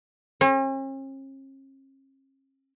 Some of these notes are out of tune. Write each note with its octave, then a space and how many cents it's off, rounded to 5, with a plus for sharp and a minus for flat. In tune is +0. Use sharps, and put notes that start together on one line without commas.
C#4 -45